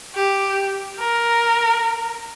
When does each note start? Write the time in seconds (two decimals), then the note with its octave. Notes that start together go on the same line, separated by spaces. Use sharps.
0.15 G4
0.99 A#4